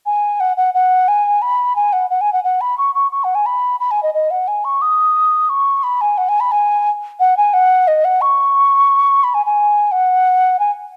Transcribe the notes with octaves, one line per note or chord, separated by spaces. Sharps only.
G#5
F#5
F#5
F#5
G#5
B5
G#5
F#5
F#5
G#5
F#5
F#5
B5
C#6
C#6
C#6
F#5
G#5
B5
B5
G#5
D#5
D#5
F#5
G#5
C#6
D#6
C#6
B5
G#5
F#5
G#5
B5
G#5
F#5
G#5
F#5
D#5
F#5
C#6
B5
G#5
G#5
F#5
G#5